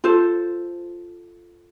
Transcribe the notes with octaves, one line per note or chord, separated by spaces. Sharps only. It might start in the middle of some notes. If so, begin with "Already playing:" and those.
F4 A4 C5